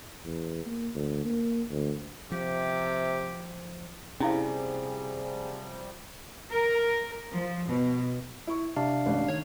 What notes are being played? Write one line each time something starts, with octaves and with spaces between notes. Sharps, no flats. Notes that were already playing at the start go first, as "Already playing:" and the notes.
E2
A#3
D2
A#3
D2
C3 F3 G4
C3 F3 G3 C#4 E4 G#4 F5
A#4
F3
B2
E4 C#6
C3 D4 F5 A5
A1
D#3 C#5